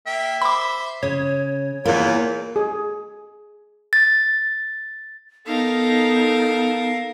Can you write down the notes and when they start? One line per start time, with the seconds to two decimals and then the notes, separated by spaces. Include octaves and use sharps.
0.07 A#3 E5 G5
0.42 C5 B5 D6
1.03 C#3 C#5
1.85 E2 A#2 A#3 B3
2.56 G#4
3.93 A6
5.47 B3 D#4 A4 A#4 F5